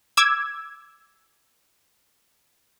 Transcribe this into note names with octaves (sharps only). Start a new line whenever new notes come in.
D6 E6 G#6